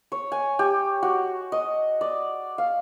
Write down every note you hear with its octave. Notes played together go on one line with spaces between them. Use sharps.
C#5
G#5
G4
F#4
D#5
D5
F5